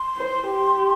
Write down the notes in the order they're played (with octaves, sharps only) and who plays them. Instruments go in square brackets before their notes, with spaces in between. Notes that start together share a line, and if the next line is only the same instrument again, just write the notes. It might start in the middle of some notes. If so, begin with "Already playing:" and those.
Already playing: [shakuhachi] C6
[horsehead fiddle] C5
G4